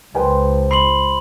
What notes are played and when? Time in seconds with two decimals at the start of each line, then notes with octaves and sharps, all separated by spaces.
0.15 C#2 F3 B4 G5 G#5
0.71 B5 C6 C7 F#7